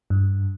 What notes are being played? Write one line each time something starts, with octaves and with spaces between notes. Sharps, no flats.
G2